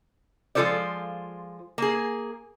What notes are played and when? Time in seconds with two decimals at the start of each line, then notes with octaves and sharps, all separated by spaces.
0.55 F3 G#3 F4 A4 C5 D5
1.78 A#3 G#4